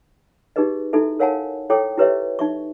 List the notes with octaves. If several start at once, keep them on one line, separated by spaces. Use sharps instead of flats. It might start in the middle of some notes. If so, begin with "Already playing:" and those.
D#4 G4 G#4 B4 D#5
D#4 E4 F#4 A4 E5
A#4 C#5 F5 F#5 G#5 A5
E4 A4 C#5 G5 D6 D#6
E4 G4 B4 C#5 D#5 E5
D#4 E5 C#6